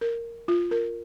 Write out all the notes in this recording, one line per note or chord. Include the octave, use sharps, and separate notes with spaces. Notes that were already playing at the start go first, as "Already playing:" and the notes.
A#4
F4
A#4